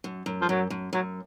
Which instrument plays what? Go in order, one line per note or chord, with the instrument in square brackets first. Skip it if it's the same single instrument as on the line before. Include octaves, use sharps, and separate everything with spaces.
[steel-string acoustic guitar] F#2
F#2
[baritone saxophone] F3
[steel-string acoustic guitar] F#2 [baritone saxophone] F#3
[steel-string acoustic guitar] F#2
[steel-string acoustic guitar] F#2 [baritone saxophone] F#3